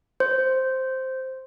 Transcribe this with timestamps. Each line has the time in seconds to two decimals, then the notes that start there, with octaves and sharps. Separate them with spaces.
0.20 C5